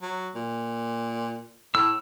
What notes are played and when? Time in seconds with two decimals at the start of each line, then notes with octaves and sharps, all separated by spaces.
0.02 F#3
0.35 A#2
1.75 A2 E6